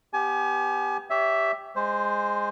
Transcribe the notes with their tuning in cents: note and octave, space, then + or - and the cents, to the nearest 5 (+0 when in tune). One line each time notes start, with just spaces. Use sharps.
B3 +0 G4 +5 G#5 +35
G4 +0 C#5 +30 E5 +0
G#3 -15 C5 +0